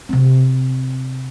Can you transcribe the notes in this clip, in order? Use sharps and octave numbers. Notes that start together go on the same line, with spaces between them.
C3 C4